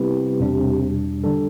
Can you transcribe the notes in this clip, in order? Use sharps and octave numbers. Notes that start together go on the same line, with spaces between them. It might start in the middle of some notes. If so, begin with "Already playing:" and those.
Already playing: C3 G3 B3 E4 G4 B4
E2 B2 G3 D4
D3 G3 D4 A4